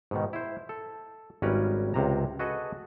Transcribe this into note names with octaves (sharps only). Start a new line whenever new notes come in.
G#2 B2 D#3
E4 C5
A4
G#1 G3 C#4 A#4 B4 A#5
C#2 C3 A#5
F#4 G#4 A4 B4 D#5 F#5